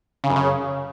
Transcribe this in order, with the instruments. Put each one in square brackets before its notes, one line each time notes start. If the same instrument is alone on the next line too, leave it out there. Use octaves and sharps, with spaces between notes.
[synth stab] C#3
F#2
C#3